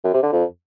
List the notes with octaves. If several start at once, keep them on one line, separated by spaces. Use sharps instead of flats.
F#2
C3
D3
F2